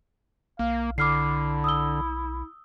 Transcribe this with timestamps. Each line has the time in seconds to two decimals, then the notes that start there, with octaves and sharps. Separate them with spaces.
0.59 B1 A#3 F5
0.98 D3 E4 D6 F6 C7
1.64 D#6 E6 G7